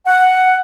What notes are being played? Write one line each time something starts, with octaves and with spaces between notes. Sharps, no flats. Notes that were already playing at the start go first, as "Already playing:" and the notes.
F#5